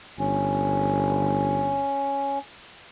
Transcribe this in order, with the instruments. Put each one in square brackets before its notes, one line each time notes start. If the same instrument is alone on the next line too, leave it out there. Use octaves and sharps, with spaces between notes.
[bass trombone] G1 [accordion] C#4